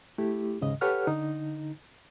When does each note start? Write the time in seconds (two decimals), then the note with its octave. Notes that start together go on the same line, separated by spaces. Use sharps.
0.18 A3 E4 G4
0.61 D#2 G#2 C#3 D#5
0.81 G4 A4 B4 C#5 F#5 F6
1.07 D3 D#4